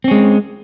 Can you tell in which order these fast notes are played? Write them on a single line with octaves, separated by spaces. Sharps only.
C4 C#4 G#3